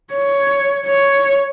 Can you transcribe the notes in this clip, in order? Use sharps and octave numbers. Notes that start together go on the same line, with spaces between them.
C#5
C#5